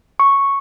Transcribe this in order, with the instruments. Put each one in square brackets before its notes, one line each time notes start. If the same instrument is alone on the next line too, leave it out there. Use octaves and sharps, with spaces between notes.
[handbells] C#6